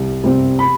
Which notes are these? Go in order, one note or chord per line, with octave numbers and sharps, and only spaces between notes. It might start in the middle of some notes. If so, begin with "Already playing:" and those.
Already playing: C2
C3 G3 C4
B5